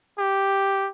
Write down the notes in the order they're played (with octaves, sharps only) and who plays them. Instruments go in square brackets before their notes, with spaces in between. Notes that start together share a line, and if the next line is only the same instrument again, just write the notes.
[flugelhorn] G4